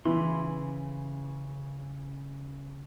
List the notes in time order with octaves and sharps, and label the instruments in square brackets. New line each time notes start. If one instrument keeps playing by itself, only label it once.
[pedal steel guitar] C#3 B5 C6 [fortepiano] E3